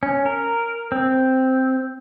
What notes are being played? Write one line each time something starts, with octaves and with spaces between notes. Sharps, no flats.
C#4
A#4
C4